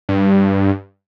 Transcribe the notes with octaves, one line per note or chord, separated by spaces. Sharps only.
G2